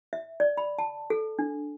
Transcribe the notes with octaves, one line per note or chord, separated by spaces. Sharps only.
E5
D5
B5
A5
A4
D4